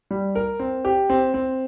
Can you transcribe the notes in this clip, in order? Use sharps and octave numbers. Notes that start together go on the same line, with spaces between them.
G3
A#4
C4
G4
C4
C4